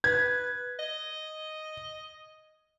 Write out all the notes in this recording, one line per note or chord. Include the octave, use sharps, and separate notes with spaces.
B4 G#6
D#5